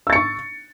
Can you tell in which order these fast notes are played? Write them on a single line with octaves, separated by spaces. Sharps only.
E6 A6 C#7 C#6